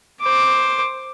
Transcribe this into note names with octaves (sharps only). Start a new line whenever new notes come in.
C5 D6